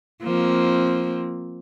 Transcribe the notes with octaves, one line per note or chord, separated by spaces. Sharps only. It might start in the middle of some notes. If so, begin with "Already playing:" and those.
F3 A#3 C4